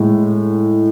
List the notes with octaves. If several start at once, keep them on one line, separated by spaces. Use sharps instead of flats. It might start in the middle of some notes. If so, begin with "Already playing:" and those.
Already playing: A2 G#3